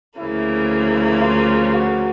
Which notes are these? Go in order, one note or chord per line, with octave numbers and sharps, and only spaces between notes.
D2 C#3 F3 A#3 E4
F4
F#4